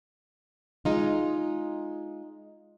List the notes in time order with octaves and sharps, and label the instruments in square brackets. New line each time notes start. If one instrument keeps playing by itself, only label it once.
[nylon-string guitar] G#3 D#4 F4